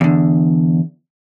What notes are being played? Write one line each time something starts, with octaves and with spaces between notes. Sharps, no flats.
E2 D3